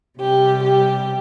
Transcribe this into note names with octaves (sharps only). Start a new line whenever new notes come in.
C3 G3 G4
G4